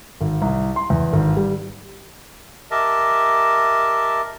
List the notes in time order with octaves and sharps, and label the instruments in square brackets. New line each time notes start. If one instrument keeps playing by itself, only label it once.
[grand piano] G#1
C2
C6
E2
G#1
G3
[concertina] G4 A#4 D#5 E5 A5